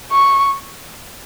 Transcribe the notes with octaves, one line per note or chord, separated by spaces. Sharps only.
C#6